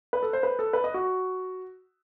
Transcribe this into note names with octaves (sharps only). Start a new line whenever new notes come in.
B4
A4
C5
B4
A4
B4
D#5
F#4